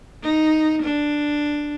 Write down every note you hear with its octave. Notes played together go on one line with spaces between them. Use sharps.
D#4
D4